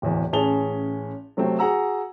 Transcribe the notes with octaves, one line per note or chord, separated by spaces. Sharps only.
D1 E2
A1 C#4 G#4 A5 F7 G7
C3 F#3 A3 C4 C5
F#4 G#4 F#5 A#5 E6